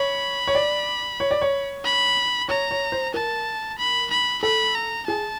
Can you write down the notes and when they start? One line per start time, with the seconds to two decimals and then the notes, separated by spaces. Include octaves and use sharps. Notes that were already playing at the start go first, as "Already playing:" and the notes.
Already playing: C#5 B5
0.47 C#5
0.55 D5
1.20 C#5
1.31 D5
1.41 C#5
1.84 B5
2.49 C#5 A#5
2.71 C#5
2.92 C5
3.14 A#4 A5
3.78 B5
4.10 B5
4.43 A4 B5
4.75 A#5
5.07 G#4 A5